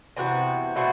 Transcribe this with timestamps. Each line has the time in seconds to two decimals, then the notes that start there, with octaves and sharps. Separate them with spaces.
0.17 C3 E3 B3 F#4
0.76 B2 A3 C4 F#4